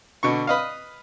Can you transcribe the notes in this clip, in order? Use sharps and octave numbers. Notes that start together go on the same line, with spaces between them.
B2 D3 C#6
B4 D#5 F5